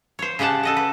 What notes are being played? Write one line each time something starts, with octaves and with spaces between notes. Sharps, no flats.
C5 C#5
C#3 G#3 G4 F#5 A5
A4 D#5 F#5
B4